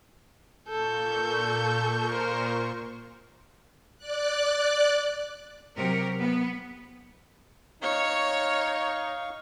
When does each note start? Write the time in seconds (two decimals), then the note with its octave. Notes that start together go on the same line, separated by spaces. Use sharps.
0.69 A#2 A4 C#6 G6
2.12 A#4 C5
3.98 D5 F#6
5.76 C3 F#3 G4 A#4
6.20 B3
7.83 D#4 C#5 F5 C#6